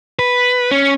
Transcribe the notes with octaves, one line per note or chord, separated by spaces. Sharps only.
B4
C#4